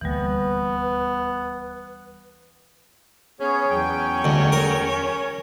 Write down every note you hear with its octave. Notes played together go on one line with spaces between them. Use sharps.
D#1 D2 E3 G3 A#3 B3 B4
B3 C#4 G#4 C#5
E2 F#3 G5
D2
A#4